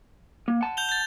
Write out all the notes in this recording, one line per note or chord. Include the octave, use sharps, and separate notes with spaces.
A#3
F#5 A5
G6 F7 G7
G6 A6